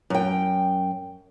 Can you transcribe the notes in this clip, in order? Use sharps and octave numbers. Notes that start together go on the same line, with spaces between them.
F#2 G5